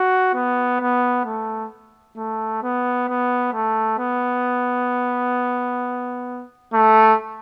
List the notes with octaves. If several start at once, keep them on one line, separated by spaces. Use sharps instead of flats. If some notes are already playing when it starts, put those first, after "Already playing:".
Already playing: F#4
B3
B3
A3
A3
B3
B3
A3
B3
A3